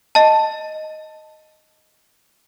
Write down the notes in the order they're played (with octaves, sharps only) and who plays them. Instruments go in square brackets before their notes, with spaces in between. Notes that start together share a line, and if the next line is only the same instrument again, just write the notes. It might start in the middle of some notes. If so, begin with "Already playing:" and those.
[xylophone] D#5 A5